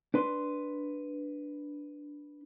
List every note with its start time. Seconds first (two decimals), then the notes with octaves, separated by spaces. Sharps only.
0.14 D4 B4 C6